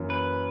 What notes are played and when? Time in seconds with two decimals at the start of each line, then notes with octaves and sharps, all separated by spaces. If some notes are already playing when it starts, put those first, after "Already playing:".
Already playing: F#2 E3 A#3
0.10 B4